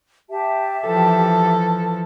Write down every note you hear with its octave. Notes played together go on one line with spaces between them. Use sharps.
G4 E5 A5
E3 F3 A4